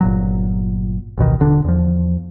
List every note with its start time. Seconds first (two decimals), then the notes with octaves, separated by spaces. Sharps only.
0.01 G1 A#2 F#3
1.18 A1 D2 B2 D#3
1.40 D#1 D3 D4
1.65 E2 F3